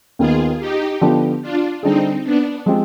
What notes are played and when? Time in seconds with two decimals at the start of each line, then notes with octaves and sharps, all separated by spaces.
0.19 D#2 D#3 B3 F4 G#4
0.60 D#4 G4
1.01 D3 F3 B3 D4 G4
1.42 D4 F4
1.83 D3 G3 C4 D4 D#4 G#4
2.24 B3 D4
2.66 F3 G#3 C4 G4